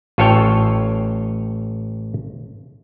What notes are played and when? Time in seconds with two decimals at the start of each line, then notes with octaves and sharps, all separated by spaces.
0.18 A1 F4 A4 C#5 F5 G5